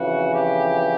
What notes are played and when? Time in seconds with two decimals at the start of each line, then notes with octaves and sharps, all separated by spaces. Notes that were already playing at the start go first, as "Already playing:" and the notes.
Already playing: F2 C#3 E3 F#4
0.35 G4